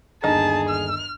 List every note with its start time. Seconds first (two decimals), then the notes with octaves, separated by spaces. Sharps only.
0.24 G1 D#2 D#3 D4 D#4 G#4 A5
0.69 F6